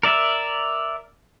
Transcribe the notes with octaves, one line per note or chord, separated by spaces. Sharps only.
A#4 D5 E5